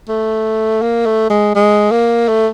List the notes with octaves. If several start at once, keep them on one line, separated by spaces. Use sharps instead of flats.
A3
A#3
A3
G#3
G#3
A#3
A3